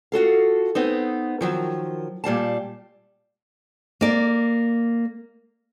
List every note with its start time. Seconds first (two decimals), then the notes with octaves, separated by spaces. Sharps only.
0.12 F4 F#4 A4 F5
0.75 B3 C4 D#4
1.41 D#3 F3 F#3
2.24 A#2 G3 F5 A5
4.01 A#3 D5